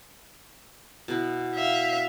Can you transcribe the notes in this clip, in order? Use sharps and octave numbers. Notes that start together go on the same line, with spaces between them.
B2 B3 E4
E5 F5